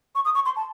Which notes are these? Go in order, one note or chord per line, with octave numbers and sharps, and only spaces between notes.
C#6
D#6
C#6
C6
A5